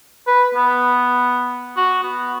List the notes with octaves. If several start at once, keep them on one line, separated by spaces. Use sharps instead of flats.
B4
B3
F#4
B3